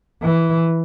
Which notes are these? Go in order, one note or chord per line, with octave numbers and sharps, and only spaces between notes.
E3